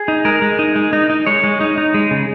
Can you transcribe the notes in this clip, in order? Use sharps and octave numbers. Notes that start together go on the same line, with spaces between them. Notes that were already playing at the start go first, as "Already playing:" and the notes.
Already playing: G#4
D#4
G#3 A#4
G#3
D#4
G#3
D#4
D#4
G#3 C#5
G#3
D#4
D#4
G#3
C#3